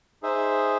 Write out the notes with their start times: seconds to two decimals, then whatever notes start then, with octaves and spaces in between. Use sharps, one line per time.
0.23 D#4 G#4 C5 E5